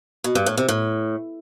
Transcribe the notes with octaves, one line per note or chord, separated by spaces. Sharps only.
B2
G2
A2
C3
A2